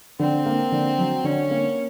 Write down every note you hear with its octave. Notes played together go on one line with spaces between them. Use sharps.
D3 C4
A#3
D3
F#3
D3 C#4
A#3